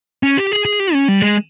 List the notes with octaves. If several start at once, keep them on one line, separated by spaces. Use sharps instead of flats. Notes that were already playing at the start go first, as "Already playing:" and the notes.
C#4
G4
G#4
G#4
G4
C#4
G3
G#3